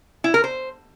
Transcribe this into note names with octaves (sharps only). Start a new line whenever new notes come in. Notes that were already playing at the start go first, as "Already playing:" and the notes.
E4
A#4
C5